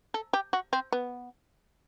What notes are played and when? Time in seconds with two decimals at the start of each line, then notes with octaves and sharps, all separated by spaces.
0.14 A4
0.33 G4
0.53 F#4
0.73 C4
0.92 B3